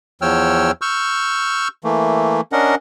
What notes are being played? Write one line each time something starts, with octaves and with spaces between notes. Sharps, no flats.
E2 F3 C#5 G5 E6 F6
C#6 E6 F6 G6
E3 A3 A#3
C#4 D4 A#4 D#5 F#5